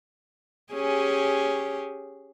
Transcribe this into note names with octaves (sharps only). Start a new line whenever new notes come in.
C#4 G4 G#4